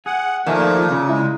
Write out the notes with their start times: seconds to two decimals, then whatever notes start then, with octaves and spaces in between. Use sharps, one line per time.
0.06 G#4 F#5
0.47 A#2 D#3 F3 A3 A#3
0.77 F4
0.91 C#3
1.09 G#3 E4